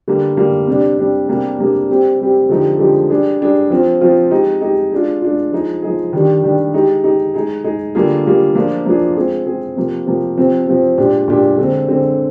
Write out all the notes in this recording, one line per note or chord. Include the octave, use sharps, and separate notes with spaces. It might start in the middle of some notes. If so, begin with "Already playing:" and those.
D3 G3 A#3
D3 G3 A#3
C3 G3 D4
C3 G3 D4
C3 G3 A#3 D4 G#4
C3 G3 A#3 D4 G#4
G3 C4 G4
G3 C4 G4
D3 F3 G#3 D#4 G4
D3 F3 G#3 D#4 G4
G3 D4 G#4
G3 D4 G#4
F3 C4 F4
F3 C4 F4
G#3 D#4 G4
G#3 D#4 G4
G#3 D4 F4
G#3 D4 F4
F3 G#3 D#4 G#4
F3 G#3 D#4 G#4
D#3 G3 D4 G4
D#3 G3 D4 G4
G#3 D#4 G4
G#3 D#4 G4
G#3 D#4 G#4
G#3 D#4 G#4
D3 G3 A#3 F4 G#4
D3 G3 A#3 F4 G#4
F3 A#3 D4 F4 G#4
F3 A#3 D4 F4 G#4
G#3 C4 F4 G#4
G#3 C4 F4 G#4
C3 F3 A#3
C3 F3 A#3
C3 F3 C4
C3 F3 C4
A#2 G#3 D4 G4
A#2 G#3 D4 G4
D3 G#3 C4
D3 G#3 C4